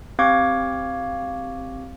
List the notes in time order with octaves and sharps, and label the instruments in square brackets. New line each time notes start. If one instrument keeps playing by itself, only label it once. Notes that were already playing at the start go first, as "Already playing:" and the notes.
[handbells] C4 G4 F5 C#6 D6 G#6